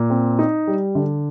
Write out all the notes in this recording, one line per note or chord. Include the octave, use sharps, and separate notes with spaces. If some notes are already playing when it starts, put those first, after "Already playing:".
Already playing: A#2
C4
D#4
G3
D3